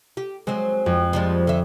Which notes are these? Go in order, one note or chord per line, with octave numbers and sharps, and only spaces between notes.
G4
F#3 G#3 C4
F2
F3 G3 G#3
D3 E5